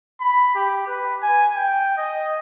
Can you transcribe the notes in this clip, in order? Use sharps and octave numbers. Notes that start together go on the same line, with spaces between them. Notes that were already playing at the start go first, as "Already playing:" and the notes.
B5
G4
B4
G#5
G5
D#5